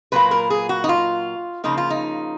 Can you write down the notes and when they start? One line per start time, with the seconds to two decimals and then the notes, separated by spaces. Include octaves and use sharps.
0.12 A#2 F#3 A#3 B4
0.31 A#4
0.50 G#4
0.69 F#4
0.84 D#4
0.89 F4
1.64 C#3 F3 A#3 D#4
1.78 F4
1.90 D#4